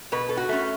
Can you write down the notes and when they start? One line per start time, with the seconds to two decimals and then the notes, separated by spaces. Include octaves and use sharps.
0.12 B2 B4
0.29 A4
0.37 F#4
0.49 A3 C#4